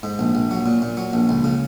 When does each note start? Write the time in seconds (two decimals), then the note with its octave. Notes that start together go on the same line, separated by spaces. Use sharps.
0.03 G#2
0.19 A#1
0.35 A#1
0.51 F#3
0.66 A#2
0.82 A#2
0.97 F#3
1.13 A#1
1.29 C#2
1.44 C#3